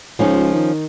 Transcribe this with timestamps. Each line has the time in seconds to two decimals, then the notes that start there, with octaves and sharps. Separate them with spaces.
0.19 C#2 F3 C#4 D#4
0.55 D#3